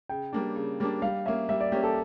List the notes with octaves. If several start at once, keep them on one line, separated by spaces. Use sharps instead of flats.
C#3 G5
G3 A#3 D4
C#3
G3 A#3 D4
G3 F5
A#3 C#4 E5
G3 E5
D5
A#3 C#4 G4
A4